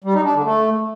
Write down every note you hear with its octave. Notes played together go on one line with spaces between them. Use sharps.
G3
D#4
D4
D3
A3